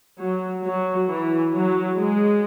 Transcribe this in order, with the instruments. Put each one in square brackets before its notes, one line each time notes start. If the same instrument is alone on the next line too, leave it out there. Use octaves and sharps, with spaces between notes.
[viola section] F#3
F#3
E3
F#3
G#3